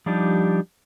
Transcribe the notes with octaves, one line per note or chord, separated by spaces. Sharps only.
F3 G3 D4 D#4 G4